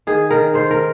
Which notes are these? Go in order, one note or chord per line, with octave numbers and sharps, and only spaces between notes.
D#3 G#4
D#3 A#4
D#3 C5
A#4